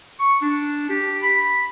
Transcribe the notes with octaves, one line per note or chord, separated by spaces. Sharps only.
C#6
D4
G4
B5